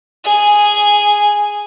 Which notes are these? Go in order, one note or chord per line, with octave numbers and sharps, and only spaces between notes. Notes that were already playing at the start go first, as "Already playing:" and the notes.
G#4 G#5